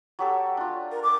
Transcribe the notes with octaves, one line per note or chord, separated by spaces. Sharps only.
F#3 G4 A4
D4 F4
A#4
D6